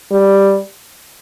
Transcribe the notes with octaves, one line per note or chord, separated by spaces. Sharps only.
G3